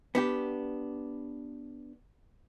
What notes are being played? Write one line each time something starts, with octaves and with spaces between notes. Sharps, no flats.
B3 D4 G4